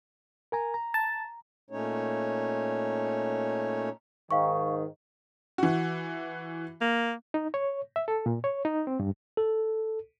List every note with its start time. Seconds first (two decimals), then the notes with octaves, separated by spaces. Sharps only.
0.52 A#4 G#5 A#5
0.74 A#5
0.94 A5
1.70 A#2 A3 C#4 D#4 C#5
4.31 G#2 D#3 F5 C#6
5.58 E3 F#4
6.81 A#3
7.34 D#4
7.54 C#5
7.96 E5
8.08 A4
8.26 A#2
8.44 C#5
8.65 D#4
8.87 C4
9.00 G2
9.37 A4